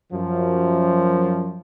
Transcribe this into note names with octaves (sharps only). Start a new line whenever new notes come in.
F#2 F3